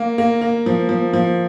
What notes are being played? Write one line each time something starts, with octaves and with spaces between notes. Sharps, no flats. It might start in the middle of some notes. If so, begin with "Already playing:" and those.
Already playing: A#3
A#3
A#3
F3
F3
F3